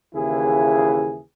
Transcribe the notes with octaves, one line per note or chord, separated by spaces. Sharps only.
D#2 C#3 E3 E4 G#4